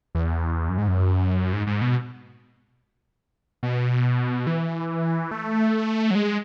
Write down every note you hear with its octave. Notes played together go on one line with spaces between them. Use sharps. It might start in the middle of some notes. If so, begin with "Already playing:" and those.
E2
F#2
G#2
F#2
G#2
G#2
B2
B2
E3
A3
F#3
G#3